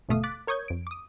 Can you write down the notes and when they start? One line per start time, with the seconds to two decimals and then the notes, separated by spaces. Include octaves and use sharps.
0.08 G1 E2 B2 A3 F5 D#6
0.23 D6 F#6 A6 B6
0.47 A#4 C#5 C#6 D#6 G6 G#6
0.68 F2 D7
0.87 D6 D#6